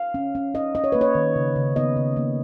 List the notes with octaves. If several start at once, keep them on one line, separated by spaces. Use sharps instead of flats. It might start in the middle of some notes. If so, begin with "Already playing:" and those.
Already playing: F5
C#4
C#4
C#4 D#5
C#4 D#5
C#5
A#3 B4
C#5
D#3
C#3
C#3
B3 D#5
C#3
A#3